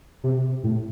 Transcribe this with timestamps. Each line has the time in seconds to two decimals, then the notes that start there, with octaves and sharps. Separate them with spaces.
0.24 C3
0.64 A2